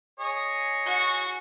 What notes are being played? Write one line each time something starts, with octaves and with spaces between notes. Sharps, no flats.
G#4 C#5 D#5
F#4 C#6